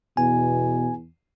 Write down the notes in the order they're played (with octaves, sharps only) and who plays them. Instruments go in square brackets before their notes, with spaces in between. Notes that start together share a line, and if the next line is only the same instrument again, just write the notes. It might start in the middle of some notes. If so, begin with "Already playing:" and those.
[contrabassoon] E2 [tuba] B2 [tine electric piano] G#5